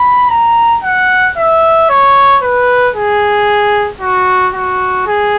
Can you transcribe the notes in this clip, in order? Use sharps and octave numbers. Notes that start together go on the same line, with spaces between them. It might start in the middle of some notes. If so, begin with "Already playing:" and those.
Already playing: B5
A#5
F#5
E5
C#5
B4
G#4
F#4
F#4
G#4